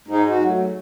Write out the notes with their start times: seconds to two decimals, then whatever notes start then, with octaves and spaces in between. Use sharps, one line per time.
0.08 G#2 D#4
0.29 F#4
0.40 F#3 A3